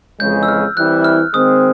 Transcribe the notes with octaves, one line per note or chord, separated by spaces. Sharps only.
F2 C#3 E3 G#3 G6
E6
F6
E3 G3 C4 E4 F#6
F6
D#3 G#3 C4 D#6